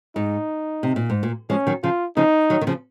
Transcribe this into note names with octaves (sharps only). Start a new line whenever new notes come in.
G#2 D#4
C3
A#2
G#2
A#2
F3 G#3 C#4
D#3 F#3
C#3 F3 F4
C#3 F3 D#4
D#3 F#3
D#3
C#3 F3